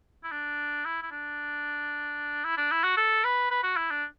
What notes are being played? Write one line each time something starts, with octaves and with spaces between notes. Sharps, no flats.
E4
D4
E4
E4
D4
E4
D4
E4
F#4
A4
B4
B4
F#4
E4
D4